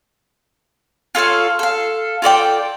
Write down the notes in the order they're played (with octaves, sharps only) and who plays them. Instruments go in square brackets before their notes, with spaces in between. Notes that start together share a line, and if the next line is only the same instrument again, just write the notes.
[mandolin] F4 A4 C#5 F5
A4 F5
F4 A4 D5 G5